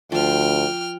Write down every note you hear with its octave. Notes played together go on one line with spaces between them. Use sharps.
D2 F3 G5 F6